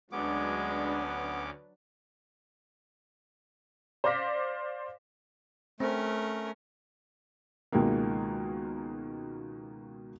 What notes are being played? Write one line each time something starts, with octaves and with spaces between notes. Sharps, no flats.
D2 F#3 G#3 B3 C#4 D4 B4 D6
C5 D5 F5 D6 A#6 B6
A3 C4 C#4 A#4
C#2 B2 D#3 G#3 A#3